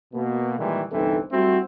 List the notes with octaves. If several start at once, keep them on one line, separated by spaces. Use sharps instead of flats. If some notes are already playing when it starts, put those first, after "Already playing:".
B2 A#3
A#2 D#3 E3 G3 G#3
G1 C2 E3 C4 D#4 A4
G3 A3 C4 E4 F#4